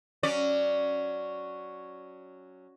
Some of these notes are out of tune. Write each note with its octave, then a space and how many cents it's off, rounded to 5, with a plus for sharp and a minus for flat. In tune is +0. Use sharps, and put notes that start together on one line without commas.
F#3 +0 C#4 +0 D5 +0